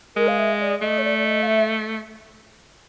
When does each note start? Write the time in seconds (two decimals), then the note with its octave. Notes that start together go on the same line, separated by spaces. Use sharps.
0.16 G#3 A#4
0.28 F5
0.38 E5
0.60 D5
0.82 A3 D#5
0.98 C#5
1.04 D5
1.18 D5
1.26 D#5
1.42 F5
1.47 E5